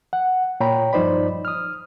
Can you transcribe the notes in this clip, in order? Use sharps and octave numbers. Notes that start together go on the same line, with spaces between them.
F#5
A#2 C#5 G5 A#5 B5
G2 F3 D#4 C5 D5 B5
D#6 F6